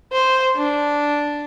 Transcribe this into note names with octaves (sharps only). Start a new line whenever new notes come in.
C5
D4